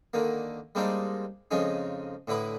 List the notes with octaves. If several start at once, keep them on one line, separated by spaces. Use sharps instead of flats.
D3 D#3 A#3
G3 G#3 A#3 C4 D4 D#4
F2 C#3 F3 G#3 C#4 D#4
A2 D3 E4 B4 D#6